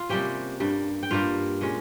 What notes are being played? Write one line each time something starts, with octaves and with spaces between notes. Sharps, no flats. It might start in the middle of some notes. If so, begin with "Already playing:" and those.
Already playing: F4 F5
C3 G3 A#3 C#4 G4 G5
G2 G3 A#3
G5
G2 G3 A#3 F4 F5
A#2 G#3 C#4